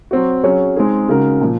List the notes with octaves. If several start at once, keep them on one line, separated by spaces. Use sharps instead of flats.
F#3 C4 F#4
F#3 C#4 G#4 C#5
G#3 C4 D#4 G#4
C#3 G#3 D#4 F#4 A#4
A#2 F3